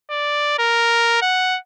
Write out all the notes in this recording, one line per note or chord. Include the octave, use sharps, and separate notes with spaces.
D5
A#4
F#5